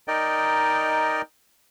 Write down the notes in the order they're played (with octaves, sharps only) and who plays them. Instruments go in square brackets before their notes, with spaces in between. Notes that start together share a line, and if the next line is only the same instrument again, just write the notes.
[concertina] D#4 A#4 D5 D#5 G5